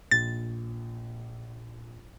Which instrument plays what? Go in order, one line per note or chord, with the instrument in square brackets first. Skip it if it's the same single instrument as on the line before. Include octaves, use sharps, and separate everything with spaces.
[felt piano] A#1 [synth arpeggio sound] A6